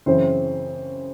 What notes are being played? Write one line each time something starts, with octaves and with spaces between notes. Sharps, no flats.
F#2 C#3 E3 C4 C5